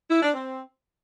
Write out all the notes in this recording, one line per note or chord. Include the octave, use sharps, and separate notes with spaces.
E4
D4
C4